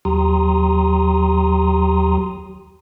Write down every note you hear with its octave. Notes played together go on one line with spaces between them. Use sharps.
D#2 F#3 G4 A#5 C6 D#6